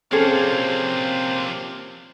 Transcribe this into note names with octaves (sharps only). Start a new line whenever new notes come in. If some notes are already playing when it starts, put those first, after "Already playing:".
C3 F3 A#3 C#4 G#4 A4 C5